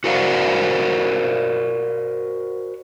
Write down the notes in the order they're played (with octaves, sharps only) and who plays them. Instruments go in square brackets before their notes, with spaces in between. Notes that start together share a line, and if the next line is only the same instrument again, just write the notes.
[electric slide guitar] F#4 A#4 C5 D5 F5 F#5